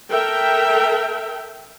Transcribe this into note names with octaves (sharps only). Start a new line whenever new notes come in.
A4 A#4 E5 G5